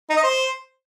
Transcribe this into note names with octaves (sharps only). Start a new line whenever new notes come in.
D#4
D#5
C5